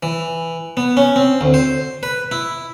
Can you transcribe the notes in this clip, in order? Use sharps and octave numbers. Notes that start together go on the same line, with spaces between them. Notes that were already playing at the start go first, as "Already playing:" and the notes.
E3
B3
C#4
C4
D2
C5
B4
E4